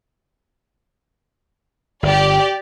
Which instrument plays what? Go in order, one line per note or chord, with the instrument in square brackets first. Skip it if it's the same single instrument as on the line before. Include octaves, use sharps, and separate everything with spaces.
[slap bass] G1 [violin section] G4 D5